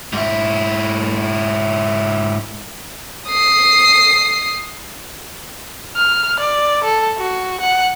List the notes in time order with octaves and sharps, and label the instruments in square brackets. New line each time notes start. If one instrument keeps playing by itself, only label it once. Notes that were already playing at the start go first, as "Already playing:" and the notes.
[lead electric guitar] G#2 E4
[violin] D#6 C7
[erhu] F6
D5
A4
F#4
F#5